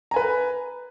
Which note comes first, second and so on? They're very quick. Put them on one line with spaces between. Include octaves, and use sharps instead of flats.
A#5 G#5 B4